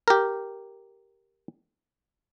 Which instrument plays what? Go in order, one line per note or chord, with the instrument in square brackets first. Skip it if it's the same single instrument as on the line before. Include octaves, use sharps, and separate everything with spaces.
[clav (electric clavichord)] G4 A#4